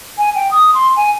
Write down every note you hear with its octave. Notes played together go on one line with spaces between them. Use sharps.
G#5
G5
D#6
C6
G#5